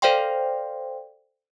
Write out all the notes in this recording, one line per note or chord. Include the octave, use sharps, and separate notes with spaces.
A4 C5 D5 F5 G5 C6